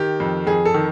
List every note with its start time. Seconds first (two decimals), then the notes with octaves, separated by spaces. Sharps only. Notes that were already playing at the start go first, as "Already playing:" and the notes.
Already playing: D#3 G4
0.20 F2
0.47 F2 G#4
0.65 A4
0.74 D#3